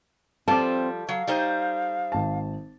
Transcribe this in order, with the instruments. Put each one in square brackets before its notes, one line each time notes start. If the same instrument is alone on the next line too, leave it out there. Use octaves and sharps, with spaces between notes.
[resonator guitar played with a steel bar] F3 G3 F4 [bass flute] C4 [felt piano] A4 D6 [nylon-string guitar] A5
[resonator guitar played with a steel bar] F#3 [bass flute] F5
[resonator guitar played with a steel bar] G3 D#4 C5
[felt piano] G#1 A5